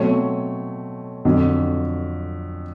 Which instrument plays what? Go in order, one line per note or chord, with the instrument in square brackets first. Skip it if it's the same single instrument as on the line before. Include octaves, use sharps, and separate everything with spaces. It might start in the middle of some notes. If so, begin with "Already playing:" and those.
Already playing: [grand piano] B2 F#3 A3 C4 C#5
F2 D3 F#3